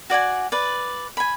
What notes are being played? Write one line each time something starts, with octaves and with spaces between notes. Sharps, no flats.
F#4 D5 F#5 G#5
B4 D5
G#5 B5